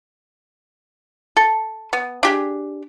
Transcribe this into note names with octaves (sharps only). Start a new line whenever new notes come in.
A4
B3
D4 G4 G#4